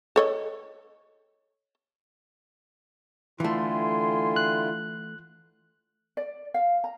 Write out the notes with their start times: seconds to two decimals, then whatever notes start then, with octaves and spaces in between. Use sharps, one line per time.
0.16 A4 C#5 D#5
3.40 D3 E3 A3 E4 F4 G5 G#5 C6
4.36 F#6
6.17 D5
6.54 F5
6.84 A#5